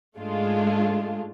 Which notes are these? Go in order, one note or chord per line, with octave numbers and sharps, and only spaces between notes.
G#2 G#3 A3 D4 F4